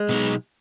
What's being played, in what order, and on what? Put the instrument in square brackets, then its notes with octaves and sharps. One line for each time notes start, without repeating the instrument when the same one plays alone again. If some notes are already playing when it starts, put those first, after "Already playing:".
Already playing: [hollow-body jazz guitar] G#3
[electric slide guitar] B2 F#3 B3 D#4